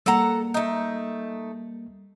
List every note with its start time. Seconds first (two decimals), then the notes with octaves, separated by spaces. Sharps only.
0.06 G3 A#3 A4 F#5 A#5
0.54 A3 D#4